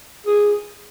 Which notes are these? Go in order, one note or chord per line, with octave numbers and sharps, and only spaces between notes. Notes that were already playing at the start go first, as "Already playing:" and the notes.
G#4